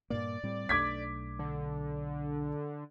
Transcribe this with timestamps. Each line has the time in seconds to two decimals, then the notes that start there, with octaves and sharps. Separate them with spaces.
0.10 G2 A#2 A#3 D5
0.43 A2 G3 C4
0.69 B1 A3 D4 D6 G#6 B6
1.39 D3